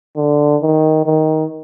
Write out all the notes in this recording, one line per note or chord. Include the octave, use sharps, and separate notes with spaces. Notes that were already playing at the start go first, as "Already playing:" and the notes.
D3
D#3
D#3